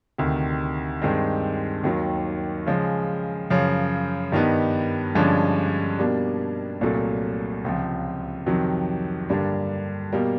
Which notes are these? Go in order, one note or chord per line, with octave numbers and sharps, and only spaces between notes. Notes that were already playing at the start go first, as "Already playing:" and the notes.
D2 C3 D#3
G2 D#3 G#3 C4
D#2 D#3 F#3
C#3 F3 G#3
F#2 C#3 F3
G2 D#3 G3 B3 D#4
G2 D3 F3 G#3 C#4
B2 G3 A#3 D4
C2 A#2 F#3 A3
C#2 C3 F3
F2 C3 D#3 F#3
G2 D3 G3 A#3 D4
B2 G3 A#3